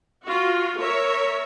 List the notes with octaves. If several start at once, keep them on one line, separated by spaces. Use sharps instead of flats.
F4 F#4
A#4 C#5 E5